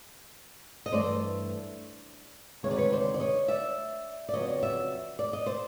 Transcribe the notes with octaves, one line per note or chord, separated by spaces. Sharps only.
D#5
G2 E3 A3 C5 D5
D2 C3 D#3 G#3 C#5
D5
B4 C#5
C5 D5
D5
C#5 D#5
D5 E5
D5
F2 C#3 F#3 B3 C#5 D#5
D5 E5
D5
D#5
C5 D5